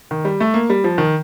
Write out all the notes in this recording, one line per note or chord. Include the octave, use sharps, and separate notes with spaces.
D#3
G3
A3
A#3
G3
F3
D#3